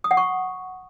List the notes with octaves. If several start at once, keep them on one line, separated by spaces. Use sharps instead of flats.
D#6
F#5
C#6